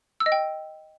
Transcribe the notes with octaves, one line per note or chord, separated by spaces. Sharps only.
E6
D#5
G5